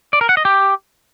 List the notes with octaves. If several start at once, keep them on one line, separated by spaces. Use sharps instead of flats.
D5
A#4
F#5
D#5
G4